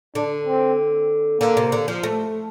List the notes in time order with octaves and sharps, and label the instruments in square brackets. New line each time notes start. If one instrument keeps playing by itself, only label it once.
[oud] D3 [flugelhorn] D4
[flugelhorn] C4
[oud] D3 [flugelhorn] A#3
[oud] C3
D3
F3
A3